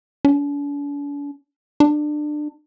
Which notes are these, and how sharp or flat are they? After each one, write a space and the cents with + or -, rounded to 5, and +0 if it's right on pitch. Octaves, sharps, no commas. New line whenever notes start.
D4 -45
D4 +25